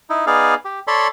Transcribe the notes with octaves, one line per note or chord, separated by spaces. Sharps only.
D#4 E4
B3 D#4 G#4 D5 F5
G4
A4 C#5 D5 B5 C6